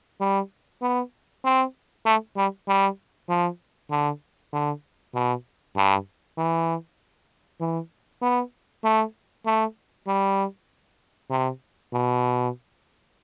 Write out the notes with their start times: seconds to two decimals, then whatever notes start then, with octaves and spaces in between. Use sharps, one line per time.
0.21 G3
0.82 B3
1.45 C4
2.06 A3
2.37 G3
2.68 G3
3.29 F3
3.91 D3
4.53 D3
5.15 B2
5.77 G2
6.38 E3
7.60 E3
8.22 B3
8.84 A3
9.46 A3
10.07 G3
11.31 C3
11.93 B2